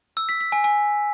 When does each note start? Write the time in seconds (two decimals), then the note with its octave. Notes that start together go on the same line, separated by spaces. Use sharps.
0.17 E6
0.29 B6
0.41 B6
0.52 G#5
0.64 G#5